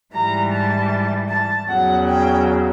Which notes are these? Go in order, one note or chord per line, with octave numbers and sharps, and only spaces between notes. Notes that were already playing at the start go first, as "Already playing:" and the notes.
G#2 E3 G3 A#5
A5
A5
E2 C#3 F#3 F#5
G5